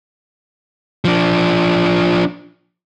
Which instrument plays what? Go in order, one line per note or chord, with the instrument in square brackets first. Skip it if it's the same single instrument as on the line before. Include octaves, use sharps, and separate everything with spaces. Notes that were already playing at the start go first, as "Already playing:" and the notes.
[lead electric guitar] F3 D4